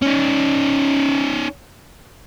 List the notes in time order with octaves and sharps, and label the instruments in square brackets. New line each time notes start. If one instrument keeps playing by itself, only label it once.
[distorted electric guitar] C#4 D#4